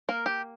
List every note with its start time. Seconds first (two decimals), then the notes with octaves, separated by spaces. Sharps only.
0.09 A#3 A#4
0.26 G4